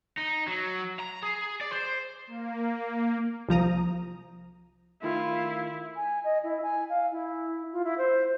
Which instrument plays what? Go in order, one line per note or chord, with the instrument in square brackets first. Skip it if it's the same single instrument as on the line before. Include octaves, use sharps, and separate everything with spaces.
[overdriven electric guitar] D#4
F#3
A#5
G#4
D5
C5
[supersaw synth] A#3
[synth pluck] C2 F3 A#5 D#6
[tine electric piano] D#3 A3 [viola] E4 [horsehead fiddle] F4
[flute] G#5
D#5
E4
G#5
F5
E4
F4
E4
C5